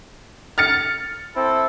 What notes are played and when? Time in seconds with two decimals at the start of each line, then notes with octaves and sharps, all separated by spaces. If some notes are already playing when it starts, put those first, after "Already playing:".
0.58 F6 A6 C#7
1.36 C4 E4 A4